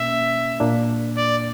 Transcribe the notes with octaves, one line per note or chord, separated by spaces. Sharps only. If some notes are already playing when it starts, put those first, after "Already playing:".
Already playing: B2 A#3 C#4 E5
A#2 A#3 D4
D5